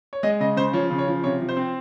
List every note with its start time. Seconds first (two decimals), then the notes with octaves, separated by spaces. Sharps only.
0.13 C#5
0.23 G#3 D#5
0.40 C#3 D#5
0.57 C#3 C5
0.73 F3 C#5
0.91 C#3
0.98 C#5
1.08 F3
1.24 C3 C#5
1.41 F3
1.49 C5
1.57 C4